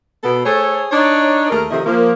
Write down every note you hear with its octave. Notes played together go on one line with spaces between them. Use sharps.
B2 B3 A4
A3 G#4 A4 C5 C#5
D4 D#4 C#5
D#2 A3 G#4 A#4
C3 D#3 F3 A3 E4 D#5
F3 A#3